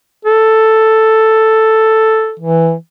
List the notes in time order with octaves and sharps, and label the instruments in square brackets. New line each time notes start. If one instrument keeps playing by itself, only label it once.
[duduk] A4
E3